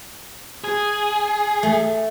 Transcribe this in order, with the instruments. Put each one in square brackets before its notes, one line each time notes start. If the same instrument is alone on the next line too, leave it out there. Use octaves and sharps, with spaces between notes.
[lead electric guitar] G#4
[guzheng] A3